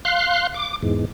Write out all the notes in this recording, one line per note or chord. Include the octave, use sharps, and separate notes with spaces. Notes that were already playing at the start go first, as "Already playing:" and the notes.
F5 C6 F#6
D6
E2 G#2